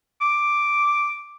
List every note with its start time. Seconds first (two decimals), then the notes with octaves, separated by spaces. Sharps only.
0.21 D6